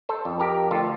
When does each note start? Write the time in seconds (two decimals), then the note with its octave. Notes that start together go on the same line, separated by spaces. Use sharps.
0.09 A4 C5
0.25 F2
0.40 G4 A#4
0.71 D2 F4 A4